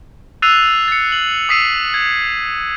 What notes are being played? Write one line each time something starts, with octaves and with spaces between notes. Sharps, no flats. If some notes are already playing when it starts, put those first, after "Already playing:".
E6 F#6 A6 C7 D#7 F7
A6 C#7
F#7
D#6 E6 B6 C7 D#7
G#6